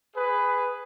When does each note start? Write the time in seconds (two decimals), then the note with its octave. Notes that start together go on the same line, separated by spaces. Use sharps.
0.15 G#4 B4